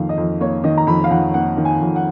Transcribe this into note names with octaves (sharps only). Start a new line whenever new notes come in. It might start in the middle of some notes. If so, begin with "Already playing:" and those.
Already playing: F2 D#3 A#3 F5
D#5
F2
A#3 C#5
D#3 D#5
A#5
F2 B5
F5
F2 F#5
A#3 F#5
D#3
G#5
F2
F#5